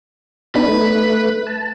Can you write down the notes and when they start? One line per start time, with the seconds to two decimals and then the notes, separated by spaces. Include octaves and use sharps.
0.55 B3 D4 D#4 B4
0.68 A3
1.47 A5